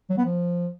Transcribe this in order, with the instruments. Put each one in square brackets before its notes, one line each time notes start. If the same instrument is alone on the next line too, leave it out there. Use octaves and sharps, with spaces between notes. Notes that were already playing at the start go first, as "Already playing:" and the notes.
[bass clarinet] F#3
B3
F3